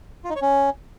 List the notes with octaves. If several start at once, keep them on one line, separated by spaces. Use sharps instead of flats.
F4
D#4
C#5
C#4